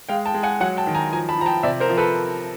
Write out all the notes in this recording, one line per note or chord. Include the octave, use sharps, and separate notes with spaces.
G#3 F5 G5
G5 A5
G#3
F#5 G#5
F#3 F#5 G#5
G5 A5
D#3
G#5 A#5
F3 G#5 A#5
A5 B5
F3 A#5
G5 A5
C3 D5 E5
A#4 C5
F3
A4 B4